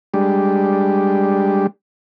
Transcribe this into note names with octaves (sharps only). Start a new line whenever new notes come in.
G3 G#3 D4 G4